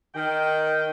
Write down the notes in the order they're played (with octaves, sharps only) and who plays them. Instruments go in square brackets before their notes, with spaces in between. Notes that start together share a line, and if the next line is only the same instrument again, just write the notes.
[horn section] D#3 G5